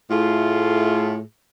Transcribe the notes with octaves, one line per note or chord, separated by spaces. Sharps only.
A2 A3 F4 G#4